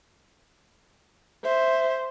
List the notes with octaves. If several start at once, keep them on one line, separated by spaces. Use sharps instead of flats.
C5 E5